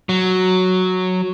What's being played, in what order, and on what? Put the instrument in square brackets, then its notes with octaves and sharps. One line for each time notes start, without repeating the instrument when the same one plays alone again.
[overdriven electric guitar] F#3